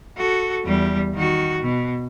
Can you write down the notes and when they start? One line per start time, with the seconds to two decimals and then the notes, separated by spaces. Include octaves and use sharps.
0.18 F#4 A4
0.65 E2 G3
1.14 D#3 F#4
1.62 B2